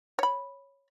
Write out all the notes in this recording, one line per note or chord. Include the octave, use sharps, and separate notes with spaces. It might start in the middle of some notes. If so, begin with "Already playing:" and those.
C#5 B5